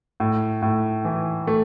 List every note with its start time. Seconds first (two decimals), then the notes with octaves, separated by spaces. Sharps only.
0.20 A2
0.62 A2
1.05 E3
1.47 A3